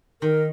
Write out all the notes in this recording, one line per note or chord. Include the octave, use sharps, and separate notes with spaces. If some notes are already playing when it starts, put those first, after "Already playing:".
D#3 A#4